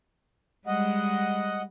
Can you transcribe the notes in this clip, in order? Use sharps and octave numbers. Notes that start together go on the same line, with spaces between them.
G3 G#3 D#5 F#5